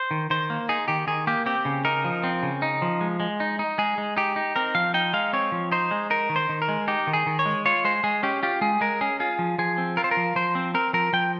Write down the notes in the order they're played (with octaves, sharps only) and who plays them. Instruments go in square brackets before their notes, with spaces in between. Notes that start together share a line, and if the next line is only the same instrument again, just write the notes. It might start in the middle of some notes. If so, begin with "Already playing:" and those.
Already playing: [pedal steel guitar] C5
D#3
D#3 C5
A#3
D#4 G#4
D#3 G4
D#3 G#4
A#3 G4
C4 G4
C#3
D#4 A#4
F3
C4
C#3
D#4
F3
G#3
G#3
D#4
D#4
G#3 G#4
G#3
D#4 G4
D#4
C4 A#4
F3 F5
D#4 G5
G#3 F5
C4 C#5
F3
D#4 C5
G#3
D#4 A#4
D#3
C5
D#3
A#4
G#3
D#4 G4
D#3
G#4
D#3
C#5
G#3
F4 C#5
G#3 C5
G#3 G#4
C#4 G4
F4 G4
G#3 G#4
G#3 A#4
C#4 G#4
F4 G#4
F3
F3 G#4
C4
F4 A#4
C5
A#4
F3
F3 C5
C4
C4 A#4
F3 A#4
F3 G5